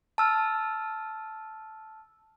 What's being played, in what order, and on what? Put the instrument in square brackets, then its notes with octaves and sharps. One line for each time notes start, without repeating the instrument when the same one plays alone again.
[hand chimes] A5 E6 F6